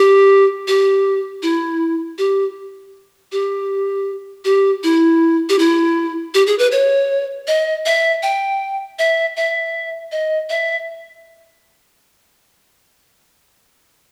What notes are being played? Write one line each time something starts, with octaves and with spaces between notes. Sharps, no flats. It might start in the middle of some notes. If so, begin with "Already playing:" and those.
Already playing: G4
G4
E4
G4
G4
G4
E4
G4
E4
G4
G#4
B4
C#5
D#5
E5
G5
E5
E5
D#5
E5